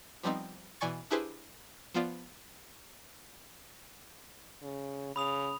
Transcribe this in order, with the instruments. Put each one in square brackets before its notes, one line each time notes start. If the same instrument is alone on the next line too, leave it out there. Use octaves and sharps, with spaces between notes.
[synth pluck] F3 G3 B3 C4 D#4
B2 E3 D5 G#5 C#6 A6
D4 E4 G4 G#4 B4 C5
F3 B3 F4 D5
[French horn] C#3
[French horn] C#3 [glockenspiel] B5 D#6 F7